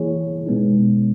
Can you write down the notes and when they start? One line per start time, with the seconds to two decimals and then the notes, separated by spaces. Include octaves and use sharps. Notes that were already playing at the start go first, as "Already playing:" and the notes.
Already playing: E3 A#3 E4 G#4 C#5
0.46 B2 G#3 B3 D#4